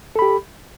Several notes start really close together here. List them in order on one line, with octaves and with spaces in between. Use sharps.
A4 B5 G4